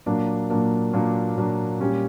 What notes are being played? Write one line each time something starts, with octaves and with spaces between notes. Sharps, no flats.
A#2 F#3 A#3 D4
A#2 F#3 A#3 D4
A#2 F#3 A#3 D4
A#2 F#3 A#3 D4
A#2 G3 C#4 G4